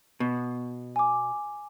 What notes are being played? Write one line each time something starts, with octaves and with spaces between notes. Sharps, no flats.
B2
G#5 D6